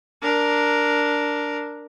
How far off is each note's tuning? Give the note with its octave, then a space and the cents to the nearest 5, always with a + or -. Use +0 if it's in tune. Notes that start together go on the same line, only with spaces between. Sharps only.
D4 +0 A#4 +0